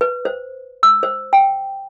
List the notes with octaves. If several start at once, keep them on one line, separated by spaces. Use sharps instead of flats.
B4
C5
E6
C5
G5